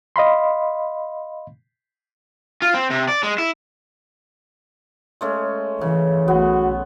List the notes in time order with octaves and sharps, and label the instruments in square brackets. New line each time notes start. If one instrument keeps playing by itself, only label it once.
[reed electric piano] D#5 F5 B5 C6
[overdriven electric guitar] F4
C4
C3
D5
G#3
E4
[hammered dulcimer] G#3 A3 C#4
[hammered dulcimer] C#3 [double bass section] E3
[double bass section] B1 A3 [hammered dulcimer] B3 [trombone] F#4